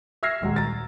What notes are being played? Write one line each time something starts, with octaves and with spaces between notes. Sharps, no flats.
E5 E6 F6 G#6 A#6 C7
D#1 D#2 G#3 F#4 A#5
A#5 A6